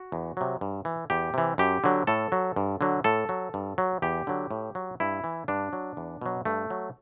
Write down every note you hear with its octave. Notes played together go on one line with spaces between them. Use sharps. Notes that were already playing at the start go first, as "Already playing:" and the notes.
Already playing: F#4
E2
C3 F#3
G2
E3
E2 G4
C3 E3
F#2 G4
D3 F#3
A2 A4
F#3
G2
D3 F#3
A2 A4
F#3
G2
F#3
E2 G4
D3 F#3
A2
F#3
G2 E4
E3
G2 D4
F#3
E2
B2 F#3
G2 A3
F#3